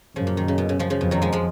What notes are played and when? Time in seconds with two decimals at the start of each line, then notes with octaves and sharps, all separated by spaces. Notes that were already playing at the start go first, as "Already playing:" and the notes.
0.16 F#2 C#3 F3
0.27 A#2
0.37 D#3
0.48 C#3
0.58 B2
0.69 C#3
0.79 C#3 F3
0.90 C#3 F3
1.00 F2 B2
1.11 D#3 F#3
1.22 F3 G#3
1.32 F3 G#3